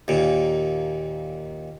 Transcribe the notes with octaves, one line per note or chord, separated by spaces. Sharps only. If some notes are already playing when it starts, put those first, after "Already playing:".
D#2 A#2